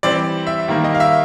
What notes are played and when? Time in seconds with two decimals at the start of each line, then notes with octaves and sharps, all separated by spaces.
0.03 E3 G3 C4 D5
0.47 E5
0.68 D#3 G3 A#3
0.84 D#5
0.95 F5
1.00 E5